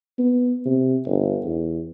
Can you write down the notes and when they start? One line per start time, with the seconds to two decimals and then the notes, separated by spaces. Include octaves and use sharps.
0.19 B3
0.66 C3
1.06 G1
1.45 E2